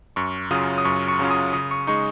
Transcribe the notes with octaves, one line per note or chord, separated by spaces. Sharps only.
F#2 C#6
C#3 F#3 C#4 F4 D#6
D#6
F#2 C#6
C#6
C#3 F#3 C#4 F4
D#6
C#3 D#6
C#6
G#3 D#4 C#6